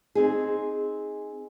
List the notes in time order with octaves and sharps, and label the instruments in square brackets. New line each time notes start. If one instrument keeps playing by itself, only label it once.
[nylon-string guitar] C4 D#4 G#4